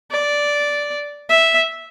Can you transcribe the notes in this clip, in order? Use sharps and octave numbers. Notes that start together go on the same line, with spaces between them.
D5
E5